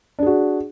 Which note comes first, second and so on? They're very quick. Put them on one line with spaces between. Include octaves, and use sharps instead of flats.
D4 G#4 F#4